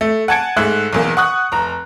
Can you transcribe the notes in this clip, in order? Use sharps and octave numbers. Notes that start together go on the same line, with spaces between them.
A3
F#5 G#5 A5 G#6 C#7 D7
G#2 A3 E5 F#6
B1 E2 A#3
F#5 C#6 D#6 F#6
F1 A#5